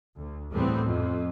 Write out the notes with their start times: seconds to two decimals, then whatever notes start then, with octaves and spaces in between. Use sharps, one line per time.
0.17 D2
0.51 E2 A2 G3 A3 B3 C4
0.83 F2